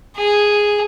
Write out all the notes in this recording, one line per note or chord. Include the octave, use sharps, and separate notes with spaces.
G#4